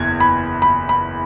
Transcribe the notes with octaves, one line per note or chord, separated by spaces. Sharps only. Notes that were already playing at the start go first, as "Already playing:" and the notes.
Already playing: F#1 E2 G#6
B5
B5
B5